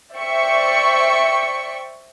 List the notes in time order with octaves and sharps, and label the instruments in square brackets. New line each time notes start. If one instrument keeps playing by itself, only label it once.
[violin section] C5 D5 E5 G5 C#6 C#7